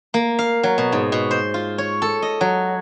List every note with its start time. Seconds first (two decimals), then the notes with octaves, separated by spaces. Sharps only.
0.14 A#3
0.39 F5
0.63 F#3
0.78 B2
0.92 G#2
1.12 B2
1.31 C5
1.54 F4
1.78 C#5
2.02 A4
2.22 D#5
2.41 F#3